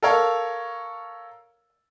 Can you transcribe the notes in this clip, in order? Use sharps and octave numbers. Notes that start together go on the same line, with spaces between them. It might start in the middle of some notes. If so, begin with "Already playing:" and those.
A4 A#4 C#5 F5